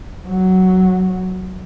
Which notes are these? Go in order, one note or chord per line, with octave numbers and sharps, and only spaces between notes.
F#3